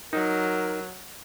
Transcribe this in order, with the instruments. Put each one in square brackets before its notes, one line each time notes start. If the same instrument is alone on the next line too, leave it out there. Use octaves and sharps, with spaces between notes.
[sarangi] F#3 [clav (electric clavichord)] D#4 [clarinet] A#4